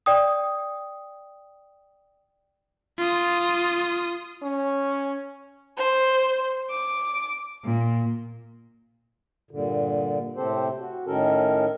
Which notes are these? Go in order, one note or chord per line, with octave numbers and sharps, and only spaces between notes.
D5 G5 D#6
F4 D#6
C#4
C5
D6
A#2
G2 A#2 D3
A2 C3 C4 G4 A4 C5
F#4
A2 D#3 C#4 A4 A#4